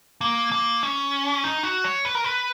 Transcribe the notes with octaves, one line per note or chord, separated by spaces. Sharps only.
A#3
A#3
C#4
D#4
F#4
C#5
B4
A#4
B4